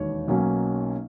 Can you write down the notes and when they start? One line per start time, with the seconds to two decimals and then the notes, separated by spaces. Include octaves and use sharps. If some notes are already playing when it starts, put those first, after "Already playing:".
Already playing: E1 D#2 D#3 C#5
0.28 B1 B2 F#3 A#3 C#4